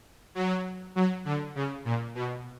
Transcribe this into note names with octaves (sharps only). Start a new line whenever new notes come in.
F#3
F#3
D3
C#3
A#2
B2